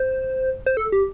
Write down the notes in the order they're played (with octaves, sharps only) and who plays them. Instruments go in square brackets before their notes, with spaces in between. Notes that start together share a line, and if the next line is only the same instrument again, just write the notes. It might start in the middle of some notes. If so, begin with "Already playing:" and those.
Already playing: [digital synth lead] C5
C5
A4
G4